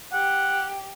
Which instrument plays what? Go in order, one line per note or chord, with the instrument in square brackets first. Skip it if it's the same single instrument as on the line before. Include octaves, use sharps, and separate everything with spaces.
[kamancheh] G4 [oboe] F#5